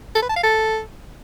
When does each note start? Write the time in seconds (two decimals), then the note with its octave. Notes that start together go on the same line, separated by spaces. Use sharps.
0.15 A4
0.22 B4
0.29 A5
0.36 F5
0.43 A4